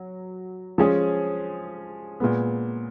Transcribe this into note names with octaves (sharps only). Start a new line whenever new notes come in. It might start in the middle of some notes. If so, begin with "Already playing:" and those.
Already playing: F#3
F3 G#3 C#4 G#4
A#2 G#3 B3